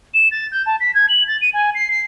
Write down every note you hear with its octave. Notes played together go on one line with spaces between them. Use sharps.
E7
A6
G6
A5
B6
G#6
F#7
A6
D#7
G#5
C7
C7